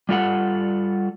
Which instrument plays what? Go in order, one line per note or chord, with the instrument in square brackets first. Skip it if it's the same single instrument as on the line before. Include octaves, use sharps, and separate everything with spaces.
[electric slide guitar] G3 F4 A4 F#5